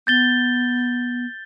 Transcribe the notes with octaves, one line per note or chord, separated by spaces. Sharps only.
B3 G6 A6 G7